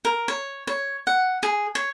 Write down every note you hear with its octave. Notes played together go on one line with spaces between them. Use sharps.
A#4
C#5
C#5
F#5
G#4
C#5